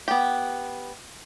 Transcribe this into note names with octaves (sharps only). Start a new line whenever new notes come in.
B3 G4